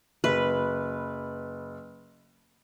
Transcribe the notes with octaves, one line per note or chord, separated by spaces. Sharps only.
F#1 B4